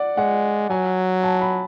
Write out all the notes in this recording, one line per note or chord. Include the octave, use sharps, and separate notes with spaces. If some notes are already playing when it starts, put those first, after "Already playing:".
Already playing: D5 F#5
G#3 F#5
F#3 G#5
A5
B5